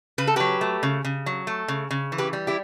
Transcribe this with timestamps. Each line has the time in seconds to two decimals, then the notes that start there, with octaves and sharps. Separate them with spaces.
0.18 C#3 B4
0.27 A4
0.36 F#3 G4 B4
0.61 A3
0.83 C#3
1.05 C#3
1.26 F#3
1.47 A3
1.68 C#3
1.91 C#3
2.12 E3
2.18 G4 B4
2.33 G3
2.47 E4 G4